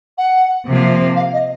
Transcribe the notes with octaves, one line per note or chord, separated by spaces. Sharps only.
F#5
C3 F3 A#3
F5
D#5